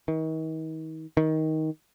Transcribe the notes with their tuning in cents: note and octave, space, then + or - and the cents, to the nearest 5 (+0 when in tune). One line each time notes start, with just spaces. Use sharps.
D#3 +40
D#3 +15